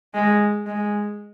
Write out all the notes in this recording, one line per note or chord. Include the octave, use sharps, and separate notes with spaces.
G#3
G#3